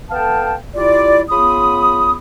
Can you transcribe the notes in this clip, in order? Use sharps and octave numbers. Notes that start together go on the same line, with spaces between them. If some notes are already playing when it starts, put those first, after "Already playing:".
B3 A4 F5 G5 A5
G3 E4 F4 D5
C#3 B3 F4 B5 D#6